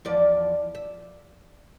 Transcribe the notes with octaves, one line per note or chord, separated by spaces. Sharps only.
E2 F3 D5
E5